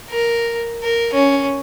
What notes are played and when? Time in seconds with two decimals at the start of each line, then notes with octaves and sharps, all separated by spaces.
0.10 A#4
0.83 A#4
1.14 C#4